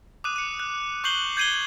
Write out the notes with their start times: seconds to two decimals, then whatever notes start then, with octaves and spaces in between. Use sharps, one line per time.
0.24 D6 D#6 F#6 D#7
0.36 C#7 D#7
0.60 F#6
1.04 C#6 F#6 G6 C7 F#7 G7
1.37 G6 G#6 C7 D#7 F#7 G7